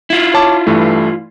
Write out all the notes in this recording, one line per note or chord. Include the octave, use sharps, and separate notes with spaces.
E4 F4
C#5 A5 D6
G2 E3 A3